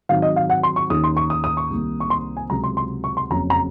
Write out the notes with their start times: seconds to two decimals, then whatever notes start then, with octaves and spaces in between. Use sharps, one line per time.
0.09 G#2 D#3 F#3 C4 F5
0.22 D#5
0.36 F5
0.50 F#5
0.63 C6
0.76 C#6
0.90 D#2 D#3 A#3 C#4 D#6
1.04 C6
1.17 C#6
1.30 D#6
1.44 D#6
1.57 C#6
1.70 C2 C3 D#3 A#3
2.00 C#6
2.10 C6
2.37 G#5
2.50 C#2 C3 F#3 A#5
2.64 C6
2.77 C6
3.04 C#6
3.17 C6
3.30 F#1 F2 C#3 F#3 C#4 A#5
3.50 A#5